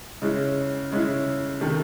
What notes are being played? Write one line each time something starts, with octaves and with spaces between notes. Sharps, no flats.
C#3 G#3 C#4 E4
C#3 G#3 C#4 E4
C3 D#3 A3